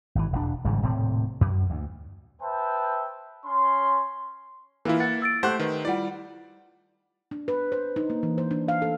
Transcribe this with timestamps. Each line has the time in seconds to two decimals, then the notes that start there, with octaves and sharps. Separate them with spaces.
0.15 G#1 E3
0.32 E1 D4
0.65 G#1 G#2 C#3 G3
0.82 D#1 A2 C3 C4
1.41 F#2
1.70 D2
2.42 B4 C5 E5 G5 A5
3.45 C#4 C6
4.85 E3 A#3 E4 F4
5.00 F#5 A6
5.22 E6 A6 D7
5.43 A3 G4 C5 F#5 F#6
5.59 D#3 B4
5.85 G3 E4 F4 D5 F#5
7.31 D4
7.48 B4
7.72 C5
7.96 D#4
8.10 A#3
8.23 E3
8.38 C5
8.51 D4
8.68 F5
8.82 A4